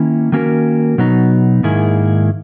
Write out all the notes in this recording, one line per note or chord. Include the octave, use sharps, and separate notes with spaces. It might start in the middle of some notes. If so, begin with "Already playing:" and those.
Already playing: D#3 A#3 C#4 E4
D#3 A#3 C#4 F#4 A#4
B2 F#3 B3 D#4
G#2 D#3 A#3 E4 G#4